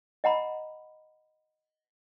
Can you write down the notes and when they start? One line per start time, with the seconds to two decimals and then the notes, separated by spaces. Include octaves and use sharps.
0.24 D#5 F#5 A#5 B5